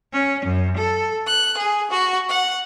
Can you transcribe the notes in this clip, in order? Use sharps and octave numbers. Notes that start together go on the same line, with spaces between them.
C#4
F#2
A4
F#6
G#4
F#4
F#5